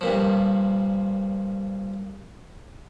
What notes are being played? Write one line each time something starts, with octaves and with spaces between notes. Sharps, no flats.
G2 A#2 F3